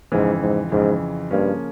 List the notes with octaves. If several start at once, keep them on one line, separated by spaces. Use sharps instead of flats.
F2 G#2 C#3 E3
G#2
F2 G#2 C#3 E3
G2 C#3 F3 A#3 C#4